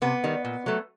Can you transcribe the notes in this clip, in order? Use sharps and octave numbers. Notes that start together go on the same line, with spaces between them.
C3 B3
D#3 G3
A#2
F#3 A3